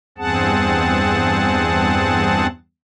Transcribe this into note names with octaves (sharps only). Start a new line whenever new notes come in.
E2 G2 C4 G#4 F#5 A5